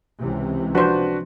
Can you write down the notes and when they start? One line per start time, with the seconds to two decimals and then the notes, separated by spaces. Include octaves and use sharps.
0.20 C#2 C3 E3
0.75 F3 D4 F#4 B4 C5